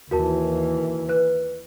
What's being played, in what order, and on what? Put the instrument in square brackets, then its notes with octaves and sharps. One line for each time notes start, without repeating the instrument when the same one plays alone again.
[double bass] D#2 E3 [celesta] F#4 A#4 A5
[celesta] B4 F#6